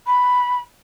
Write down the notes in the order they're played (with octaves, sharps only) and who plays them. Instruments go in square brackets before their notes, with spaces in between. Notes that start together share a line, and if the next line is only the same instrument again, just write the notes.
[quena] B5